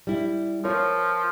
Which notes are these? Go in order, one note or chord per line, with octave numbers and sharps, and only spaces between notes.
G3 E4
F3 F4 A#4 C#5